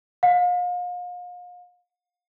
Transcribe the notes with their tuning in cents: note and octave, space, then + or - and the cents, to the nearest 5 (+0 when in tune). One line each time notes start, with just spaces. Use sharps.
F5 +40